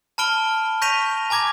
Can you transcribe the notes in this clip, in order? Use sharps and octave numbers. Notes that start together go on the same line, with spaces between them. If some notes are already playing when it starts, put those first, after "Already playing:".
A5 B5 F6 D7 G7
C#6 G6 A#6 B6 D#7 F7
G#5 A#5 D6 G#6 A#6